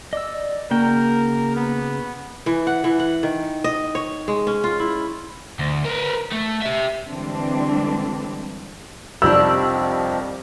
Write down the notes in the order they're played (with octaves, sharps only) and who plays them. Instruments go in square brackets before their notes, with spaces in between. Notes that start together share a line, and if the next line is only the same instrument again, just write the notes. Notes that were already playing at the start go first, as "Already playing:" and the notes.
[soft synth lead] D5 [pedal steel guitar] D#5 E6
[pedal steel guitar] C#3 F#4 G5 [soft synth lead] A#3 [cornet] A#4
[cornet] B3
[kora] E3
F#5
E3
F#5
D#3
D#5
C#5
G#3
C#4
F4
E4
[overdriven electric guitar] D2
A#4 B4
A3
G4 E5
[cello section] D3 E3 G3 G#3 C4 D4
[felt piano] C2 F2 [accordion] D#3 F3 [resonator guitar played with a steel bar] G3 D4 [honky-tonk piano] E6